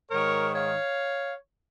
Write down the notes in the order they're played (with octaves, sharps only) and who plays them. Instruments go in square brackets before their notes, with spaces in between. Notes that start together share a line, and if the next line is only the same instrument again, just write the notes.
[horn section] G#2 D#3 A#4 C#5
C#5 F5